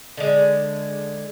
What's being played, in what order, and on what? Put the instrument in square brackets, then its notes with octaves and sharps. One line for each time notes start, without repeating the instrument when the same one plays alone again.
[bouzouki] D3 G#3